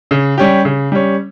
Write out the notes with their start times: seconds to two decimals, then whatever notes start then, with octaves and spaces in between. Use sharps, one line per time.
0.11 C#3
0.38 G3 C#4 G4
0.65 C#3
0.92 G3 C#4